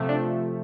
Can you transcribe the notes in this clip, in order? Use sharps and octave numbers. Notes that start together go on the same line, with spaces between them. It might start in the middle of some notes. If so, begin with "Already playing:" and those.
Already playing: C3 F3 A3
D4